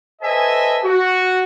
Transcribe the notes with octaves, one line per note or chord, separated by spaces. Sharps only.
A4 B4 C5 D#5 E5 G#5
F#4